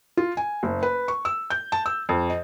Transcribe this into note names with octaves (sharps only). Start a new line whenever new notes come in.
F4
G#5
F#1
B4
C#6
E6
G6
A5
E6
F2
D#5